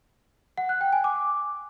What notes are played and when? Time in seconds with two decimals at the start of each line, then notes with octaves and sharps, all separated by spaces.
0.58 F#5
0.69 F#6
0.81 G5
0.93 G#5
1.04 D6